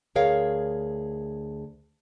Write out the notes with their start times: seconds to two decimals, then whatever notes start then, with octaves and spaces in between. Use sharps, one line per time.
0.15 D2 G#4 A#4 C#5 F5